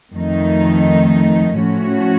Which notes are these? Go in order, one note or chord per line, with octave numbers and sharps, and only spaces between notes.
F2 D#3 A3 D#4
A2 F3 A3 C#4 F#4